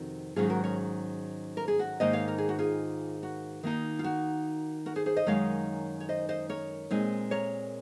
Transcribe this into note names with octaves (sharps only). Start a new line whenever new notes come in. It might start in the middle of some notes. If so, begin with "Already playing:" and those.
Already playing: F2 C3 D#3 F#4
G#2 D#3 F#3 C#4 F4 G#4
F#4 A#4
A#4 C#5
A#4
G#4
F#4
G#2 D#3 A#3 D#4 C5 D#5
C#5 F5
A#4
G#4
F#4
F4 G#4
F#4
D#3 A#3 D#4
F4
F#4
F#4 A#4
G#4 C5
G#4 C5
C5 D#5
F#2 D#3 G#3 D#4 C#5 F5
C#5
C5 D#5
C5 D#5
A#4 C#5
A#2 G#3 C4 D#4
A#4 C#5